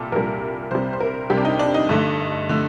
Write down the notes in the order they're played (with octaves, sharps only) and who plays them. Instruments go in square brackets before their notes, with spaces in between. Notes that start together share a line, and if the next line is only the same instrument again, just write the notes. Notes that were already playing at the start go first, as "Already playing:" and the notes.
Already playing: [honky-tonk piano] C2 A#2 G3 A4
C2 A#2 G3 A#4
C2 C3 G3 C5
C5
A#4
C2 C3 G3 G4
D4
D#4
D4
D#4
G2 D3 A3
D3 A3